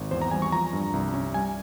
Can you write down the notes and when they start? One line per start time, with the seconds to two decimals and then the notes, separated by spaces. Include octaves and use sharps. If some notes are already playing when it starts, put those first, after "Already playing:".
Already playing: G#1
0.11 E2 C5
0.22 A#5
0.31 G3 G#5
0.42 C#6
0.52 F3 A#5
0.73 G2
0.93 C2
1.14 C#4
1.34 G3 G#5